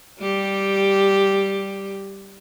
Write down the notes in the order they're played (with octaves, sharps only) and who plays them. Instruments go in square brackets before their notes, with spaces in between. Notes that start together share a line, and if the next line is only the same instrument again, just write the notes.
[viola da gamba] G3 G4